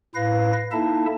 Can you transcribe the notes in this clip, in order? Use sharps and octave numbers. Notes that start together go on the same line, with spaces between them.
A2 E4 B4 F5 A#6
A#3 D#4 E4 A4 E5 A5